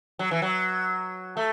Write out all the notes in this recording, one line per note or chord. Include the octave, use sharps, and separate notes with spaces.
F#3
E3
F#3
A3